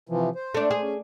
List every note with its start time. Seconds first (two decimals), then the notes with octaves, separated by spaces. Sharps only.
0.09 C3 E3 F3
0.35 C5
0.54 A3 D4
0.71 G#4
0.82 C#4